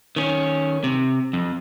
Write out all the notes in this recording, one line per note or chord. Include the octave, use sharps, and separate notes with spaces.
D#3 C#4
C3
F2